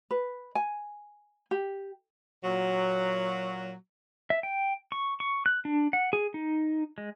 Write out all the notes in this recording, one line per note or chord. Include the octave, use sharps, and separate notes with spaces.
B4
G#5
G4
A#2 F#3
E5
G5
C#6
C#6
F#6
D4
F#5
G#4
D#4
G#3